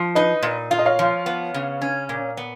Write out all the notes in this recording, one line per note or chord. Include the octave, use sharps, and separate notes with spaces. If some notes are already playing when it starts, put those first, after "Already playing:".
Already playing: F3
D#4 B4 D#5
A#2
F4 F5
D#5
C#5 F5
F3
B3
C#3
C#4
A#2
B3